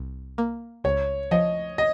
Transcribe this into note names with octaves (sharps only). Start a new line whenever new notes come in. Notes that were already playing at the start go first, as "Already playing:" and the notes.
Already playing: C2
A#3
C#2 C#5
F3 D#5
D#5